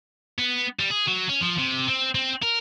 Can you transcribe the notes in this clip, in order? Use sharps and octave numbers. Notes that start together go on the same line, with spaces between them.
B3
G3
G#4
F#3
C#4
F3
C3
C4
C4
A#4